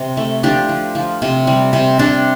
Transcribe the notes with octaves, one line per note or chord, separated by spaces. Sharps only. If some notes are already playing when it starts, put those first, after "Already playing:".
Already playing: C3 C5
A3
F3 D4 G4
F3
F3
C3
G3
C3
C3 D4